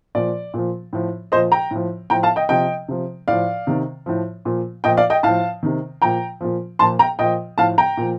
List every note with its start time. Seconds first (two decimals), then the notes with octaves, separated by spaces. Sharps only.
0.15 A#2 F3 D5
0.54 A#2 F3
0.93 A2 F3
1.32 A#2 C5 D#5
1.36 F3
1.52 G5 A#5
1.71 A2 F3
2.10 A2 F3 G5 A#5
2.23 F5 A5
2.36 D#5 G5
2.49 C3 F3 D#5 G5
2.88 C3 F3
3.28 A2 F3 D5 F5
3.67 C3 D#3
4.06 A2 F3
4.45 A#2 F3
4.84 A#2 F3 D#5 G5
4.97 D5 F5
5.10 D#5 G5
5.23 A2 F3 F5 A5
5.63 C3 D#3
6.02 A#2 F3 G5 A#5
6.41 A#2 F3
6.79 A#2 F3 A5 C6
6.99 G5 A#5
7.19 A#2 F3 D#5 G5
7.58 A2 F3 F5 A5
7.78 G5 A#5
7.97 A#2 F3